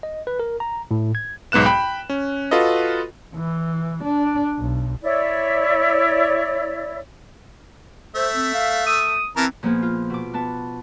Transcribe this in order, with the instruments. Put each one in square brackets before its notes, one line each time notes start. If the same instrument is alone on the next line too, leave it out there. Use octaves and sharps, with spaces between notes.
[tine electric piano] D#5
B4
A#4
A#5
A2
G#6
[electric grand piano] B1 G#2 B3 F#6 E7
G5 B5
C#4
F4 F#4 A4 B4 D#5
[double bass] E3
D4
B1
[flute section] E4 C#5 D5
[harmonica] A3 E5 [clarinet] C5
[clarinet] C4
F5
D#6
[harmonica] E3 A#4 A5 [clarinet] C4
[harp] A#2 F3 A#3 B3 G#4
F4
B2 D6
B3 A5